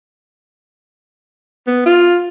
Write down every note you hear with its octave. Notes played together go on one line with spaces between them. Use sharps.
B3
F4